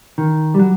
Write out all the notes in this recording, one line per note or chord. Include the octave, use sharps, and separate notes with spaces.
D#3
G3
F#3